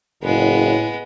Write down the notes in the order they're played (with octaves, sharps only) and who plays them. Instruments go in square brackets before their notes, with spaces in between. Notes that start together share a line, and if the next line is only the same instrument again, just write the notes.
[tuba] F#1 [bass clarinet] A2 [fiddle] G#3 B3